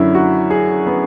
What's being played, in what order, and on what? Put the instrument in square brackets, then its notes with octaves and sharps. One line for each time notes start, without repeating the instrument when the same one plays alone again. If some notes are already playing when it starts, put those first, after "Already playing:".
Already playing: [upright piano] F#2 D3 F#3 E4
F#4
G#4
B3